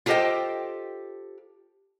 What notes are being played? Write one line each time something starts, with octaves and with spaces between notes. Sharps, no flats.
F4 G4 A4 C5 D#5 G5